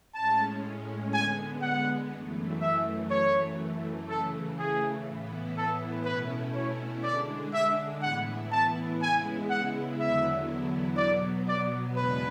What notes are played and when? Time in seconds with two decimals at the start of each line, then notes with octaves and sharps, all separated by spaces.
0.14 A2 G#3 C#4 A5
1.14 D3 G#3 B3 G#5
1.62 F#5
2.11 F#2 E3 A3
2.61 E5
3.10 F#2 E3 A3 C#5
4.08 C#3 E3 A3 A4
4.58 G#4
5.07 A2 E3 B3 E4
5.57 A4
6.05 B2 A3 C#4 E4 B4
6.55 C#5
7.04 D3 G#3 D4 D5
7.53 E5
8.02 A2 E3 B3 E4 F#5
8.52 A5
9.01 C#3 G#3 B3 E4 G#5
9.50 F#5
9.99 E2 D3 F#3 B3 E4 E5
10.97 B2 F#3 B3 D5
11.47 D5
11.96 E2 C#3 G#3 B3 D4 B4